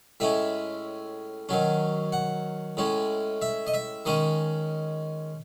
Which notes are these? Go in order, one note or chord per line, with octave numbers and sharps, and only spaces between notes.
A2 G#3 C#4 E5
D#3 F#3 C#4
F#5
A2 G#3 C#4
E5
D#5
E5
D#3 G#3 C#4 D#5